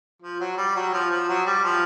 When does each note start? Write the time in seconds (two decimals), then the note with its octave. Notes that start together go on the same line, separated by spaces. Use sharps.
0.22 F3
0.40 F#3
0.58 G3
0.76 F#3
0.93 F3
1.11 F3
1.29 F#3
1.46 G3
1.64 F3